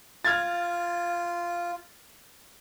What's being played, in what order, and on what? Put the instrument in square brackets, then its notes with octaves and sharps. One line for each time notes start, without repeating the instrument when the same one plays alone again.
[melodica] F4 [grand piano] F6 G#6 A6